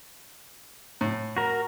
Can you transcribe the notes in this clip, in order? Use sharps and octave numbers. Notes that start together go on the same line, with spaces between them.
A2
F#4 A#4